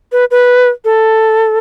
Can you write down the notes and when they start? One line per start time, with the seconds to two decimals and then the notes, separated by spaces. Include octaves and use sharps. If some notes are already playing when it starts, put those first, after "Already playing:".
0.12 B4
0.31 B4
0.85 A4